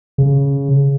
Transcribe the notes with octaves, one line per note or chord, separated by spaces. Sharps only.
C#3